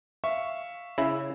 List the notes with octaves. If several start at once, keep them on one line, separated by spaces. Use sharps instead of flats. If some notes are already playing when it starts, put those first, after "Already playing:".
E5 F5 C#6
C#3 E4